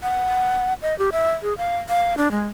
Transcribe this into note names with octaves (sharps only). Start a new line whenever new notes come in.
F#5
D#5
G4
E5
G#4
F5
F5
D4
G#3